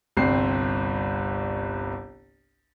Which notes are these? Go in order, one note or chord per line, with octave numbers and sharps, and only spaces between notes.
G1 C2 C4 C7